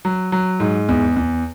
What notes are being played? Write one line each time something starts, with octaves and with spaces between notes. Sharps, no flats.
F#3
F#3
G#2
E2
E2